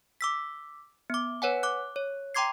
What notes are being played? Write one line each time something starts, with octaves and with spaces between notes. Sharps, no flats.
D6 E6 B6
B3 D6
B4 C#5 F#5 G#5
D6 F#6
C#5
G5 A#5 C6 D6 G#6 C7